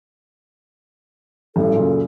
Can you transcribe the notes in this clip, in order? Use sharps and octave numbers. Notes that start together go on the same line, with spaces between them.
A1 G2 A4
F#2 A#2 C#3